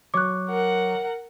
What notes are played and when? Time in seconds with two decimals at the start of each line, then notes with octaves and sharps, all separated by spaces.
0.14 F#3 C#5 C#6 D6 F#6
0.49 A#4 F#5